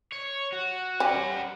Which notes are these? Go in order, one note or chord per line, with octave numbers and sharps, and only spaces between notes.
C#5
F#4
G3 C#4 A#4 F#5